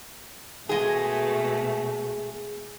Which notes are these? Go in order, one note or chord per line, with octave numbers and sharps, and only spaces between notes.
B2 G#3 A3 F#4 G#4